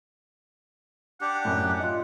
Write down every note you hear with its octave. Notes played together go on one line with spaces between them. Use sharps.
D4 G4 F#5
F#2 A2
F4 D#5